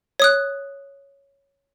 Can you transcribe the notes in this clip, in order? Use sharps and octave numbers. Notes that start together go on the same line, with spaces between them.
C#5 D#6 F#6